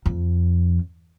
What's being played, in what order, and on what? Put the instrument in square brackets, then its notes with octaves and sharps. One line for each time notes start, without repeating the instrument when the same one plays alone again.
[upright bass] F2